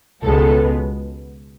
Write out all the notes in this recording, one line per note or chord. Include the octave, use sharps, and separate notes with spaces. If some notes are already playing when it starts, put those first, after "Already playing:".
C#2 B2 G#3 B3 A4